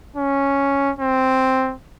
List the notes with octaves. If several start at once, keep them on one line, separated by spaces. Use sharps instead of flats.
C#4
C4